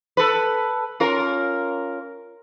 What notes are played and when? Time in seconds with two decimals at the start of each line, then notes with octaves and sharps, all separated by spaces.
0.17 A4 B4
1.00 C#4 F4 A#4